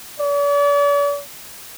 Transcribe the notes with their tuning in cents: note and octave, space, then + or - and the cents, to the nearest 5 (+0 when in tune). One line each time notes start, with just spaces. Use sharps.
D5 -45